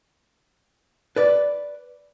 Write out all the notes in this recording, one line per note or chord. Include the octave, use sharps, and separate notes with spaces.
B4 D5